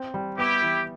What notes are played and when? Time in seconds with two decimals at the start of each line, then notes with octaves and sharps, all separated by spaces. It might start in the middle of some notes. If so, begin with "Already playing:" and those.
Already playing: C4
0.14 G3
0.38 B3 E4 G4
0.62 E3